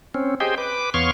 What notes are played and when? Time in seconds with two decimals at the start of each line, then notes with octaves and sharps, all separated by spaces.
0.14 C4 C#4
0.40 G4 G#4 C5 D#5 G5
0.58 B4 D6
0.94 E2 B3 C#5 F5 C6 C#6